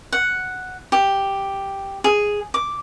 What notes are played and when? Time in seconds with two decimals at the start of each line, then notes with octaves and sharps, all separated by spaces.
0.12 F#5
0.92 G4
2.04 G#4
2.54 D6